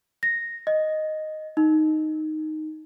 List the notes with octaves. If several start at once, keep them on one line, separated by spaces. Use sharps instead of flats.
A#6
D#5
D#4